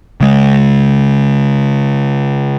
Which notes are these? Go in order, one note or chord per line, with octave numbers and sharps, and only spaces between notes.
C#3 G#3